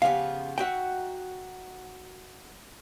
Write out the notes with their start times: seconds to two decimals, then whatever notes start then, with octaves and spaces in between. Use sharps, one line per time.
0.02 C#3 F3 B3 G4 F5
0.58 D#4 F#4 E5 F#5 G5